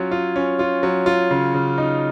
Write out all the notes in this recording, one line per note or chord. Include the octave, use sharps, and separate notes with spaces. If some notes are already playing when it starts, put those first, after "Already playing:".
Already playing: F#3 C#4 F4
F4
C#4
F4
F#3
F4
C#3
C#3
D#4